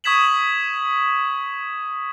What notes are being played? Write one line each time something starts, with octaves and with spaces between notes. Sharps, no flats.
C#6 D#6 G#6 B6 E7 F#7